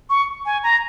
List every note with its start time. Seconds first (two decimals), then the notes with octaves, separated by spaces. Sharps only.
0.10 C#6
0.46 G#5
0.63 A#5